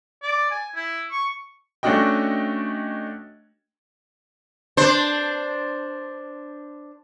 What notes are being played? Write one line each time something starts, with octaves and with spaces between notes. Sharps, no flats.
D5
G#5
E4
C#6
A3 C#4 D4 F#4 D#5 G5
D4 C5